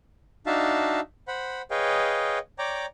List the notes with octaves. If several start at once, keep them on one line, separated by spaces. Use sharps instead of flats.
D4 D#4 F#4 E5 F5 A5
C5 F#5 B5
G#4 B4 C#5 D#5 F5 G5
C#5 D5 G5 A#5 D6